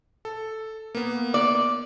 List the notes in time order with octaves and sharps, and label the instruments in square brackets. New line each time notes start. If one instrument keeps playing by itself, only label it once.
[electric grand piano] A4
A#3 B3
[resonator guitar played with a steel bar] D5